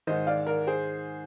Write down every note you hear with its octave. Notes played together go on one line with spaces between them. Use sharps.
G#2 D#3 C5 D#5
D5 F5
A#4 D5
G#4 C5